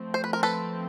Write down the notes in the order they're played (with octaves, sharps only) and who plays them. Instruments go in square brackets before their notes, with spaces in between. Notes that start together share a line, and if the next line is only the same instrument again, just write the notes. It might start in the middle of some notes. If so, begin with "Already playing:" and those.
Already playing: [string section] F3 A3 C4
[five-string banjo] C5
B4
A#4
A4 B4